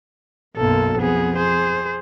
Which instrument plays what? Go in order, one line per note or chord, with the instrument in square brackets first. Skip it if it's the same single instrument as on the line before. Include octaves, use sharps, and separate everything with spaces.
[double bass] B1 F#2 [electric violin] A#3 A4
[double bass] F2 [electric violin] B3 G#4
[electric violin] G#4 C5